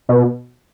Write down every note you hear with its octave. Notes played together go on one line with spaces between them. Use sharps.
B2